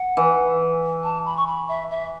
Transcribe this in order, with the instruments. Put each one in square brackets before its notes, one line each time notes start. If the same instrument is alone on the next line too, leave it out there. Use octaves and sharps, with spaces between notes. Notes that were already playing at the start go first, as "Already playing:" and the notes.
Already playing: [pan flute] F#5
[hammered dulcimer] E3
[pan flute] A5
B5
C#6
B5
E5
E5